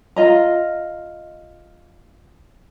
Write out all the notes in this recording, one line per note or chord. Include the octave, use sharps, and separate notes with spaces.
F4 D#5 A#5